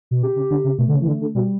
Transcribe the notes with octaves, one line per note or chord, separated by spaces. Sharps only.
B2
C#3 G4
C#3
D3
C#3
B2 A3
D3
C#3
E3
D3
D3
B2 G3